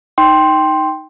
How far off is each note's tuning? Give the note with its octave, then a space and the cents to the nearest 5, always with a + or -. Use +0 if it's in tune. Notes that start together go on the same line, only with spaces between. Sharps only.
D#4 +0 G5 +0 C6 +5